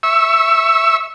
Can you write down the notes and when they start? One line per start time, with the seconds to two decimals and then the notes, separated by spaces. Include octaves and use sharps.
0.03 E5 C#6 E6